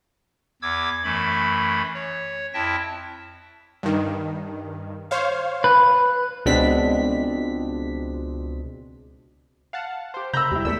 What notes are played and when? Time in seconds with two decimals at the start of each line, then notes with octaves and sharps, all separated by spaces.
0.62 E2 D6 E6 G#6
1.03 F#2 E3 A3 B5
1.94 C#5
2.54 F2 E4 E5 G5 A5 A#6
3.83 G2 D#3
5.11 C5 C#5 F5
5.64 B4
6.45 C#2 B2 G#3 C4 D4 B6
9.73 F5 F#5 A5
10.14 G4 C5
10.33 C#3 A#5 B5 E6 G6
10.51 E2 G3 E4
10.65 E2 A3 A4 D5 E6 B6